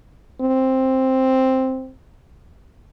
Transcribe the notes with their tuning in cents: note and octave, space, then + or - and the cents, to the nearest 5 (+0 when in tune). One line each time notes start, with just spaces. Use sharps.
C4 +5